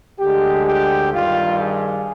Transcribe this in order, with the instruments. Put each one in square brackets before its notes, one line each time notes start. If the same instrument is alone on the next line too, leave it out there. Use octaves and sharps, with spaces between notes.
[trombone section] D2 D3 G#3 G4
G4
G2 D#3 G3 F4
G#4